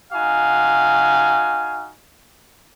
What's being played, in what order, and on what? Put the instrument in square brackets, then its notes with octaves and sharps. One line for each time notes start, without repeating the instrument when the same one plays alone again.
[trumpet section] D#4 F#4 F5 G#5